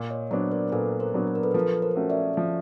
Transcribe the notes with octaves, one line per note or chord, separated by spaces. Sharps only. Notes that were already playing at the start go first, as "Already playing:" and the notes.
Already playing: A#2
C#5 D#5
F#3 B3 D4 C5 D5
A#4 C5
A#2 A4 B4
A#4 C5
F#3 B3 D4
B4
A#4
A4 B4
F3 A4 B4
A#4 C5
A3 C#4 F#4
D5 E5
F3